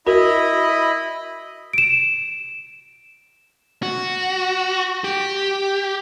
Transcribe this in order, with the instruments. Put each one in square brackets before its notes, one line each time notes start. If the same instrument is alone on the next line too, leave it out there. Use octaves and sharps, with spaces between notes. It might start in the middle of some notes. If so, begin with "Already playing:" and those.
[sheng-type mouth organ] E4 D#5 B5 [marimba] F#4 A#4
[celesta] D7 E7
[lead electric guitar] F#4
G4